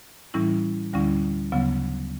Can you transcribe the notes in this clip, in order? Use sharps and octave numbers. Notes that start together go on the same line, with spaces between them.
A2 E3 G3 C#4 E4
D2 D3 G3 C#4 E4
D2 C#3 F#3 B3